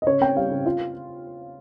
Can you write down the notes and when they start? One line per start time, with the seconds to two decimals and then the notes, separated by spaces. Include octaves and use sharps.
0.02 D#5
0.07 C#3 C#5
0.21 C4 G5
0.36 G3 F5
0.51 C#3
0.66 F4